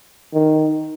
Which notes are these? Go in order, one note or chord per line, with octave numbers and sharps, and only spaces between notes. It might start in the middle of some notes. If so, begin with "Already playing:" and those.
D#3